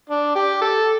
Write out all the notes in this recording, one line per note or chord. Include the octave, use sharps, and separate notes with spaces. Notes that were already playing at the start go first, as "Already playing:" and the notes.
D4
G4
A4